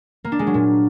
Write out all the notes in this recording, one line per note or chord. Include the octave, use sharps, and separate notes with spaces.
A#3
D4
G#3
F#3
A#2